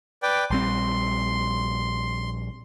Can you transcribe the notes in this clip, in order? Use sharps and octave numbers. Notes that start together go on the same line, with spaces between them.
B4 D5 G5
A#1 G3 C4 C6